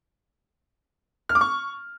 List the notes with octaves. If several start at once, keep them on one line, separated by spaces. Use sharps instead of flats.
F6
D6
C#6